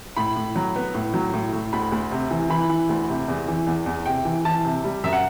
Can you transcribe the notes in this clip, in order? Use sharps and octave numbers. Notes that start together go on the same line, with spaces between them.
A2 B5
A2
F#3
B3
A2
F#3
A2
A2
D2 B5
D2
C3
E3
E3 B5
E3
D2
C3
E2
E3
E2
E2
C3 G5
E3
E3 A5
C3
G3
F#2 E5
F#5